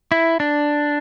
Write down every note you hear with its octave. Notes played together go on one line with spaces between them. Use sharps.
E4
D4